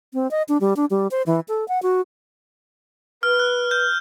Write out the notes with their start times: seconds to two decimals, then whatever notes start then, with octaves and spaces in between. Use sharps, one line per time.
0.13 C4
0.31 D#5
0.48 D4
0.61 G3
0.76 D4
0.90 G3
1.11 C5
1.26 E3
1.48 A4
1.68 F#5
1.82 F#4
3.23 B4 F6
3.39 F#6
3.71 G6